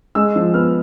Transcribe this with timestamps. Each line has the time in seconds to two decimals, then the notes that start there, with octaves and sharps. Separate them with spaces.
0.15 G#3 E6
0.36 F3
0.54 B3 F6